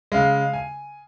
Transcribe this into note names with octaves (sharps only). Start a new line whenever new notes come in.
C#3 G#3 F5
G#5